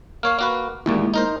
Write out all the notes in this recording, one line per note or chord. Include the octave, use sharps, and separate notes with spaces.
A#3 C#5 F5 F6
A#3 F#4 B4
A1 D#2 A#2 G#3 A#3 E4
D#4 A#4 C5